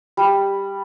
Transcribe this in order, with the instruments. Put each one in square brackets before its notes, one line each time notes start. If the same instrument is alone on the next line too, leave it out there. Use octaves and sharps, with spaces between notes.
[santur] G3